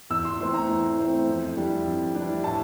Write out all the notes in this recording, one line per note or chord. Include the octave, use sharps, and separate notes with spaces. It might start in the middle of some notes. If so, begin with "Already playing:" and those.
E2 E6
C6
E3 A3 C4 C6
A#5
E2
E3 A3 C4
F2
E3 G3 D4
F2
E3 G3 D4
A2 A5